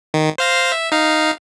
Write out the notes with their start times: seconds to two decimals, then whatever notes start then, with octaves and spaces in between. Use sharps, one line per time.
0.14 D#3
0.38 C5 F5 A#6
0.72 E5
0.92 D#4 F5